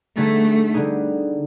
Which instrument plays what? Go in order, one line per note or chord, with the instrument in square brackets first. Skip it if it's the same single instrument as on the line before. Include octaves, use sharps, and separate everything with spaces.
[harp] D3 G3 B3 D#4 G#4 [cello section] A3
[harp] D3 G3 B3 D#4 G#4